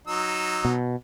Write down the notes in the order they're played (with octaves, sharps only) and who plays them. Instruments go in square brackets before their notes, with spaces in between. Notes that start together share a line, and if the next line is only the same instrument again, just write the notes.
[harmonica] F#3 D#4 E6
[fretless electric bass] B2